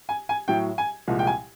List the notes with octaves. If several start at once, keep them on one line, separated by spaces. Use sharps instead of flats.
G#5
G#5
A2 F#3 G5
G#5
C2 A#2 F3 G#3
G5
G#5